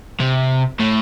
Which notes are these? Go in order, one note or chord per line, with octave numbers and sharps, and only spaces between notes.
C3
A2